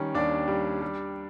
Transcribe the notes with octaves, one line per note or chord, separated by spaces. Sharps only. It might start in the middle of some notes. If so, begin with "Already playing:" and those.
Already playing: D#3 G3 C#4
D#2 D4 D5
G3
G3